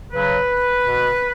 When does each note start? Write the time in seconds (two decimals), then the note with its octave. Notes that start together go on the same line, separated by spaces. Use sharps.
0.11 C#3 F#3 C#4 B4
0.83 B2 B3